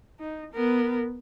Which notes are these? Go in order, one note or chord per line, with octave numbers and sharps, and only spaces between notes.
D#4
B3 A#4